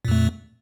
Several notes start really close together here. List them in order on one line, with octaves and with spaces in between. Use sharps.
A#2 F2 A3